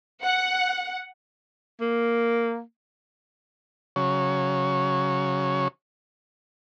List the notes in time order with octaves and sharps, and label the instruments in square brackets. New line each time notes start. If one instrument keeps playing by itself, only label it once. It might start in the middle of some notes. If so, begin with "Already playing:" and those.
[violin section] F#5
[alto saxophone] A#3
[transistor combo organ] C#3 F#3 C#5